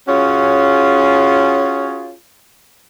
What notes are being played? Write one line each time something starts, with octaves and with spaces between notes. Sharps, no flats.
C#4 F4 F#4 G#4 C#5